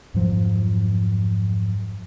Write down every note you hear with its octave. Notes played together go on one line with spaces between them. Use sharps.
F2 G#2 F3 F#3